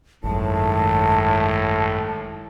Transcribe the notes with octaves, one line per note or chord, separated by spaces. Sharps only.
G#1 F#2 A2 D#3 G#3 A5